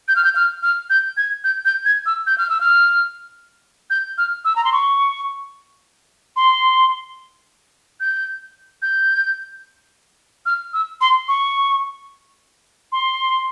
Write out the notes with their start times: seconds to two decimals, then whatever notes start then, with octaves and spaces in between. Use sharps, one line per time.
0.08 G6
0.16 F6
0.24 G6
0.36 F6
0.63 F6
0.90 G6
1.17 G#6
1.44 G6
1.65 G6
1.85 G#6
2.06 E6
2.27 G6
2.38 F6
2.49 E6
2.61 F6
3.90 G6
4.18 F6
4.45 E6
4.56 A#5
4.65 C6
4.72 C#6
6.36 C6
8.00 G6
8.82 G6
10.46 F6
10.73 E6
11.01 C6
11.28 C#6
12.92 C6